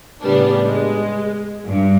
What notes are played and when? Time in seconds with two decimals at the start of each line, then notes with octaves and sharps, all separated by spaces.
0.22 A2 C#3 G3 B3 D4
0.65 G#3
1.67 G2